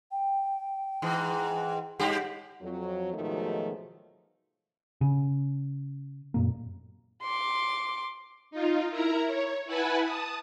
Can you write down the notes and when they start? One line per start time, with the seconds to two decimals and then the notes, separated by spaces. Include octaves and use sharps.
0.12 G5
1.02 G#2 E3
1.99 G2 G4 F#5
2.61 F2 F#3
3.13 G#2 B2 D#3 F3 F#3 A3
5.01 C#3
6.34 F#2 A#2 A#3
7.23 C6 D6
8.51 D#4 F4
8.90 E4 A#4 A#5
9.27 C#5
9.66 E4 B4 F#5 G#5 A5 B5
10.04 A5 D#6